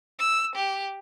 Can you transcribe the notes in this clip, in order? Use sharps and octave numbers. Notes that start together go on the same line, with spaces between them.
E6
G4